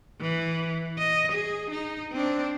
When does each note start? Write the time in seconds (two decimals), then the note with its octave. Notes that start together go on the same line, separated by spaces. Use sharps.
0.20 E3
0.99 D#5
1.32 G#4
1.70 D#4
2.12 C4 D4